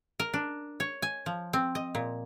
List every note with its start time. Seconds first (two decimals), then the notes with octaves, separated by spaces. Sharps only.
0.19 A#4
0.34 D4
0.80 C#5
1.02 G#5
1.26 F3
1.53 C4
1.75 D#5
1.95 A#2